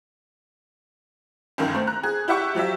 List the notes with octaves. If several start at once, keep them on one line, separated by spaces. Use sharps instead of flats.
G1 C#2 F#2 D#3
A3 C4
A#5 F#6
G#4
E4 G4 E5 F#5 C#6
F3 F#3 G4 E5